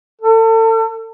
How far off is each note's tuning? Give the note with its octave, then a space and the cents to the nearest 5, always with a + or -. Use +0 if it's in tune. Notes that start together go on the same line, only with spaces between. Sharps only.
A4 +35